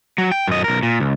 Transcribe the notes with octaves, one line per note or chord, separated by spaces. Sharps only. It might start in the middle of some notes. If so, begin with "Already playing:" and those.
F#3
G5
F#2 D#5
B1 A#4
A#2
C#2